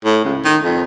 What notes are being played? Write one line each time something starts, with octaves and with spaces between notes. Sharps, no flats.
A2
C#2
D#3
F2